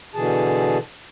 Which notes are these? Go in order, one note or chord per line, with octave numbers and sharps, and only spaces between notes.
B2 D3 E3 G#4 A5